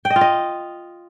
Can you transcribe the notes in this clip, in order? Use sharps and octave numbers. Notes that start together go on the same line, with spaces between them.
G5
D#5
F4
D#5